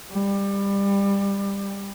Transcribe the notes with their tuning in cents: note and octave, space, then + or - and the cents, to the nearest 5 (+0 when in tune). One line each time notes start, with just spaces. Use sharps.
G3 +20